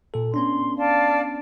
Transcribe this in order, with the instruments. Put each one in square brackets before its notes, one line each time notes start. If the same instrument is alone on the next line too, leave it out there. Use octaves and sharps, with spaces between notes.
[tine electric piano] A#2 A4
[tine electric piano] B3 C#4 D4 [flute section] C6
[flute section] D5 F5 A5